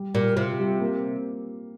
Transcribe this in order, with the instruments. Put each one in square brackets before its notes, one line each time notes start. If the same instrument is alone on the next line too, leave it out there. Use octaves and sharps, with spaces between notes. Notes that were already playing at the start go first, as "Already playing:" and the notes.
Already playing: [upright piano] G3
[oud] A#2 [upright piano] G3
[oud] C3 [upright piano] F4
[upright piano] G3
A#3